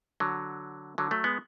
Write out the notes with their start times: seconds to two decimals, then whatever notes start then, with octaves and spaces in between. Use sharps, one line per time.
0.20 D3 F#3
0.98 D3 F#3
1.11 F#3 A3
1.24 G#3 B3